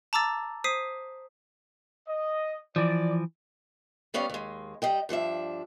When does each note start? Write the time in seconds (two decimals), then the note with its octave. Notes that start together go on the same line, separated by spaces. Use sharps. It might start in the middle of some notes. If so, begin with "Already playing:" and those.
0.13 A5 A#5 D6 E6 A6
0.64 C5 D#6 B6 C7 D#7
2.07 D#5
2.76 E3 F3 D5
4.14 G3 B3 C#4 D5 F5
4.29 D#2 G#3
4.82 G3 D#5 G5
5.09 G2 F3 D4 E5